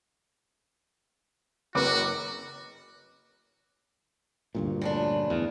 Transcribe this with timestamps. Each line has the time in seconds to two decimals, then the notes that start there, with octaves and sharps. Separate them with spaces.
1.75 F#1 F#4 B4 D6
4.55 D2 G2 A#2
4.81 C#3 F3 D4
5.30 E2